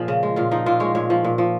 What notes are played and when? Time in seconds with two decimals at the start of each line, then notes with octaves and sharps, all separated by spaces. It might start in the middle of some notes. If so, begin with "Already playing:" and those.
Already playing: A#2 F3 G#4
0.08 C#3
0.23 G#3
0.36 A#2 F4
0.51 F3 D#4
0.66 A#2 F4
0.80 G#3 C#5
0.95 A#2 C#5
1.10 F3
1.24 A#2
1.38 F3